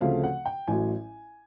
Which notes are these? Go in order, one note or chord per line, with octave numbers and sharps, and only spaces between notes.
D2 C#3 F3 A3 C4 F5
F#5
G5
A1 A2 F#3 G#5